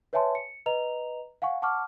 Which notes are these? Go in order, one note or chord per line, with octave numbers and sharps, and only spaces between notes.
B4 C#5 E5 G#5 A5 C6
C#7
B4 D#5 A#5 F7
F5 F#5 G#5 C#6
F#5 A5 C#6 D6 F6